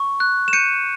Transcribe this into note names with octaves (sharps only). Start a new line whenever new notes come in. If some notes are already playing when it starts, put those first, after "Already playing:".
Already playing: C#6
F#6
E7
G6 C#7 D#7